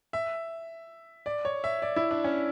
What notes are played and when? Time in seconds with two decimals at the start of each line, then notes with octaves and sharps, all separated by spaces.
0.13 E5
1.26 D5
1.45 C#5
1.64 E5
1.82 D5
1.96 E4
2.11 D4
2.24 C#4